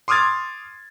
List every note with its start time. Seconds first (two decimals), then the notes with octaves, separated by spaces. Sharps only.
0.08 C6 D6 D#6 F6 G#6 A6